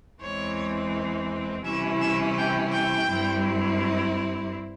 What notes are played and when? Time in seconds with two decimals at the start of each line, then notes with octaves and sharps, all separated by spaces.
0.21 E2 E3 G#3 C4 C#5
1.65 C3 E3 G3 C#4 E4 E5
2.01 E5
2.37 G5
2.73 G5
3.09 G2 G3 C4 E4